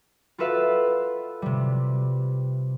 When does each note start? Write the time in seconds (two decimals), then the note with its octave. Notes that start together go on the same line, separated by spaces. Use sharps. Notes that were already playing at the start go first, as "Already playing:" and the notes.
0.38 F4 F#4 A4 B4 E5 F5
1.42 C3 G3